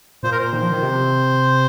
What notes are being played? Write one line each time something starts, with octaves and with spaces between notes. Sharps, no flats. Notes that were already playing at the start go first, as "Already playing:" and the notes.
A#2 C5
A#4
C5
D#3
F3
D#3
C3